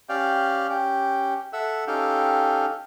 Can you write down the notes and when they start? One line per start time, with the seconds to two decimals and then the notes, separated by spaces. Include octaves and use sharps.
0.09 C#4 G4 D5 F5 G5
0.70 C#4 G4 G5
1.53 A4 E5 F#5 E6
1.87 C#4 D#4 G4 A4 F5 G5